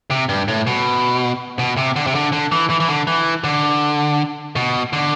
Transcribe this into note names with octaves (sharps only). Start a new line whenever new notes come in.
C3
G2
A2
B2
B2
C3
D3
C3
D3
D3
E3
E3
E3
D3
E3
D3
B2
D3